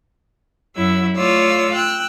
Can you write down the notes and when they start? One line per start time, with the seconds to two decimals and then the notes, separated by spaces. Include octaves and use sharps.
0.76 F#2 F#3 E4 E6
1.16 A3 F4 C#5 D5 E6
1.74 G5 E6 F#6